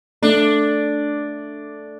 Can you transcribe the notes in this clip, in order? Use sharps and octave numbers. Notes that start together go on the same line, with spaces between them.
A3 D4